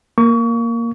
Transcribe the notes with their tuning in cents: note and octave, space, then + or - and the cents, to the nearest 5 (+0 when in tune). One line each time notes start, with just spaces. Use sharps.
A#3 +0 C#6 +30